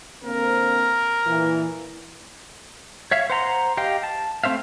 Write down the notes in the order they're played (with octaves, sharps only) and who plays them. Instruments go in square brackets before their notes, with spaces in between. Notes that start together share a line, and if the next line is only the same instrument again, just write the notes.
[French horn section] D3 A#3 C4 [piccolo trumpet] A#4
[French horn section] A#2 E3
[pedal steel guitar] C#5 E5 F5
C5 F#5 A#5 C6
G4 D#5 F5 G5
A5
A3 C4 C5 E5 F5